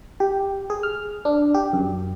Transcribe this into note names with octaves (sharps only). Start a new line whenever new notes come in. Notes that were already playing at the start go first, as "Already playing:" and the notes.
G4
G#4
F6
D4
G4
F#2